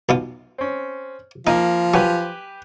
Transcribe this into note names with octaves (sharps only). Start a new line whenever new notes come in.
B1 B2 F4
C4 C#4
F3 A#3 D#4
F#3 G4 B4 G#5